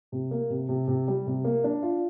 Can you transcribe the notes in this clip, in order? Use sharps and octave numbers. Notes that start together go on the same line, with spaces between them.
C3
A#3
C3
C3
C3
G3
C3
A#3
D4
F4